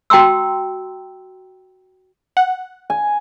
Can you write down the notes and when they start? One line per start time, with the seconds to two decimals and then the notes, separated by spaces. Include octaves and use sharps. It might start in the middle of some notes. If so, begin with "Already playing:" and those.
0.10 F#4 G5 A#5 C6 E6
2.37 F#5
2.90 G#5